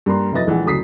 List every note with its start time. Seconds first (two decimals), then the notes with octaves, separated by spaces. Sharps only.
0.06 G2 A#3 A#5 C6
0.32 F1 F#3 E4 B4 D#5 A6
0.47 A#1 E3 G#3 F#5
0.65 F#1 D2 F#3 D#6 B6 C7